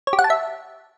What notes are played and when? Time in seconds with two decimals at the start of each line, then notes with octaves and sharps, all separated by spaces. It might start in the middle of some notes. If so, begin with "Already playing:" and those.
0.07 C#5
0.13 G4
0.19 F#5
0.24 A5
0.30 E5